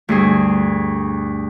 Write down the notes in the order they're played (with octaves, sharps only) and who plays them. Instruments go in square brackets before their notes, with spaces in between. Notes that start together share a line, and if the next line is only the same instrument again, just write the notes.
[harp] D2 G2 G#4